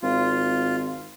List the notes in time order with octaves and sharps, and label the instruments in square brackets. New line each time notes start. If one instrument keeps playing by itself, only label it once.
[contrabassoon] G#1 [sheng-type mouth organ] F4